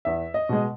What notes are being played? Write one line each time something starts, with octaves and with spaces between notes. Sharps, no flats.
E2 E5
D#5
B2 G#3